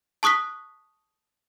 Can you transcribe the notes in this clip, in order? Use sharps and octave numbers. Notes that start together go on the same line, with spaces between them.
A5 C#6 D#6 F#6 B6